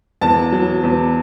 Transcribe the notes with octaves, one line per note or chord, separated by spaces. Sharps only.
E2 A5
F#3
E2